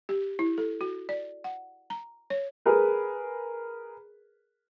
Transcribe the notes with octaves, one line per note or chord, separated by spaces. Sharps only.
G4
E4
A4
F#4
D5
F#5
A#5
C#5
G#4 A#4 B4